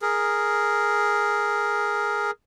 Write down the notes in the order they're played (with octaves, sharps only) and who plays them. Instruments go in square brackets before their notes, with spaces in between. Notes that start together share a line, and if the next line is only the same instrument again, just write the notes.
[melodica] G#4 A#4